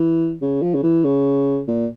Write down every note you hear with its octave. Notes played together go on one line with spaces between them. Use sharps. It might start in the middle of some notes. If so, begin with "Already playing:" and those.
Already playing: E3
C#3
F3
C#3
E3
C#3
A#2